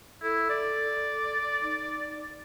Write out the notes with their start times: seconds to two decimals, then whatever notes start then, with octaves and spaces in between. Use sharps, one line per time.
0.23 E4 A4
0.50 D5
1.62 D#4